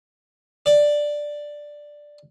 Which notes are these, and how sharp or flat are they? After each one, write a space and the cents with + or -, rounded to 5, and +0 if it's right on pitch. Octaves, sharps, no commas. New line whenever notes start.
D5 +5